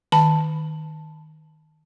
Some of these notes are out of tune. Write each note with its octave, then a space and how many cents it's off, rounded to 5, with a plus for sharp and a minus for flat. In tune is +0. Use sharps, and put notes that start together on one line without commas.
D#3 +0 A5 +0